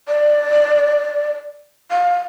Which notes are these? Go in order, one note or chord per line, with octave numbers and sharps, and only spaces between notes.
D5
F5